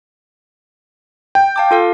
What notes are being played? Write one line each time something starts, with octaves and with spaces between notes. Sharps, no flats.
G5
F5 A5 D6
F4 A4 F5